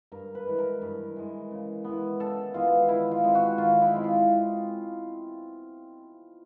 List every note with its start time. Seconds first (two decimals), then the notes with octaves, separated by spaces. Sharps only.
0.12 G2 A#4
0.35 B4
0.47 E3 G#3
0.59 A#4
0.82 G2
1.16 E3 G#3
1.51 C#3
1.84 E3 G#3 B3
2.19 C#3 A4
2.54 E3 G#3 B3 F4
2.89 D#3 E4
3.11 F4
3.24 G#3 C4 E4
3.35 F#4
3.58 D#3 F4
3.82 E4
3.93 G#3 C4 E4
4.04 F4